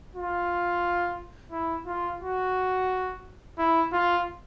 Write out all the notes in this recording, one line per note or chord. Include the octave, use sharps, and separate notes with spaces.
F4
E4
F4
F#4
E4
F4